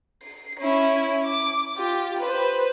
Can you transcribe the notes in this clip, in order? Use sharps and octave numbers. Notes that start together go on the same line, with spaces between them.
C7
C#4 E4
D6
F4 G4
B4 C5